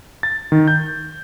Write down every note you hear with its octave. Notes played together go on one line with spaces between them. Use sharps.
A6
D#3
G6